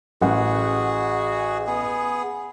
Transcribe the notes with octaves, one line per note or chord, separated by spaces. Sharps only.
A1 F#4 G#4 F#5
B3 G#4